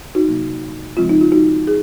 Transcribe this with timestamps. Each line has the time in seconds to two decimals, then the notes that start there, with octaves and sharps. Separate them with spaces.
0.15 D#4 F#4
0.27 C3 F#3 A#3
0.97 C#3 F3 G#3 C4 F4
1.09 D#4
1.21 F4
1.32 D#4 F#4
1.67 G#4